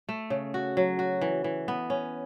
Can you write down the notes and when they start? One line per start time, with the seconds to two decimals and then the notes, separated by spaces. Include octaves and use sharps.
0.09 A3
0.30 C#3
0.54 F#4
0.77 F#3
0.99 F#4
1.21 E3
1.44 E3
1.68 B3
1.90 C#4